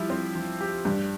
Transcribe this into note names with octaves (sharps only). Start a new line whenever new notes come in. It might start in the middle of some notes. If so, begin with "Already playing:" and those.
Already playing: F3 G3 E4 G4
C4
F3
G4
G2 G3